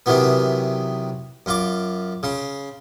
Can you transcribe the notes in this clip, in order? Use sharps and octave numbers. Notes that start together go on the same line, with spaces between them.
C3 D#3 E3 F#3 B3
F#2 F4 D6
C#3 C6